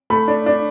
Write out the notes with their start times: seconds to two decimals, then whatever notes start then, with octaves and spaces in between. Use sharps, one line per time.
0.10 A3 B5
0.28 D4
0.46 D4